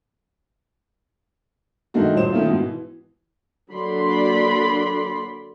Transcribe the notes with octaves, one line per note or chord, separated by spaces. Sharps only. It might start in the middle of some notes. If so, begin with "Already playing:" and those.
G2 D#3 G#3 A3 D#4 F#4
D#1 C#2 F#3 C5 E7
D#3 A3 A#3 C#4 E4 F4
G#2 B2
E3
D3 F#3 A#3 D5 B5 C6